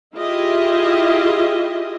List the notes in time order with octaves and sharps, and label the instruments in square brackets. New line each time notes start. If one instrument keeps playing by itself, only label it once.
[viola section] E4 F4 G4 G#4 D#5 E5